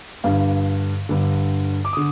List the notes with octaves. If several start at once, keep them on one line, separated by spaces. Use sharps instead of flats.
G2 D3 F5
G2 D3
D6
D3 D#6